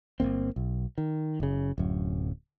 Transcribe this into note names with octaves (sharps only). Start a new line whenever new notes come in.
G1 F2 A#3 C4
B1
D#3
F#1 C#3
D1 F#2